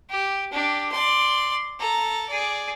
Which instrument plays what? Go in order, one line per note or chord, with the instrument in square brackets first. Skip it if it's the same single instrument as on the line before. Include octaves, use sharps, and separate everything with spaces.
[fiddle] G4
D4 G4
D5 C6
A4 A#5
G#4 D5